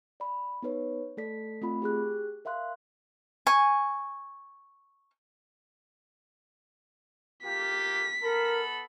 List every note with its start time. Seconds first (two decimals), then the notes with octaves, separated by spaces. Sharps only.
0.20 D5 B5
0.62 B3 D#4 B4 C#5
1.17 A3 A4 D5 B6
1.62 A3 C4 F4 B5
1.82 G4 G#4 F#6
2.45 A#4 E5 F5 C6 F#6
3.47 G#5 C#6
7.44 A#3 F4 G4 B6
8.23 B3 A4 A#4 B5